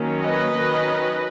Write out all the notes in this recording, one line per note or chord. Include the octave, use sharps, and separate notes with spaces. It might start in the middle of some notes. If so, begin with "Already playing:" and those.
Already playing: D#3 F#3 A#3 C#4
B4 D#5
D#3 F#3 C#4